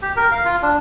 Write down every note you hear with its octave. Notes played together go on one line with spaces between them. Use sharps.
G4
A#4
F5
F4
D4